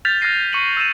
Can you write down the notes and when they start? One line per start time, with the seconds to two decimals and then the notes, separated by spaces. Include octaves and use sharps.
0.05 F6 G6 A6 B6 F7
0.21 F6 F#6 G#6 A#6 C7 D#7
0.53 C#6 C#7 D#7 F#7
0.77 E6 F6 A6 D#7 E7